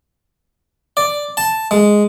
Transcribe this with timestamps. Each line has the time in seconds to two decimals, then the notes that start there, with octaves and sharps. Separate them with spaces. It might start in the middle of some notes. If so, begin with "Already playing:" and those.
0.97 D5
1.37 A5
1.71 G#3